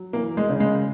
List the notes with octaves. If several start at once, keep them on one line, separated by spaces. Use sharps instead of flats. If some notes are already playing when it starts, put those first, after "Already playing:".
Already playing: F#3
E3 A#3
G#3
C#3
G#3